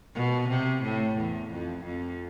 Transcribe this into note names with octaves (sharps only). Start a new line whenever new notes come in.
B2
C3
A2
E2
F2
F2